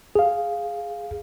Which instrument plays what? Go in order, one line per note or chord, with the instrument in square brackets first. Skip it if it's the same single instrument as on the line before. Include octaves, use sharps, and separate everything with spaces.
[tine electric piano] G#4 F5